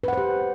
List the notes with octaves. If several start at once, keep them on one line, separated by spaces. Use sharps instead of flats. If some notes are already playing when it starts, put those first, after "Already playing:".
G4 B4 C5 F#5